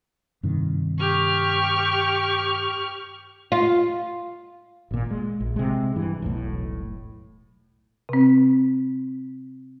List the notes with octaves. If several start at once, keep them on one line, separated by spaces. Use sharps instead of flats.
G2 C3 D#3
G4 C#6 F6
F4
G#1 A#2
G#3
A#1
C3 G#3
G2 E3
E1 B1 A2
C3 C4